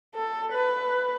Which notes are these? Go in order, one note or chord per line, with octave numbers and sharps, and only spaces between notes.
A4
B4